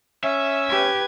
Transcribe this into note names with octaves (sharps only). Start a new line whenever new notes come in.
C#4 E5
G4 B4 G#6